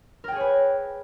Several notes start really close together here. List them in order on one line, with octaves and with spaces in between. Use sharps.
A#4 G5 G#4 C#5 B4